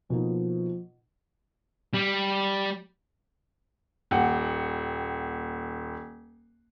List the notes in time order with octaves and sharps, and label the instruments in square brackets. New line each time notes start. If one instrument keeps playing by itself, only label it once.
[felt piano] B2 A#3 D#4 [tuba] F3
[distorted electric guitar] G3
[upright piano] D#1 F#5 G5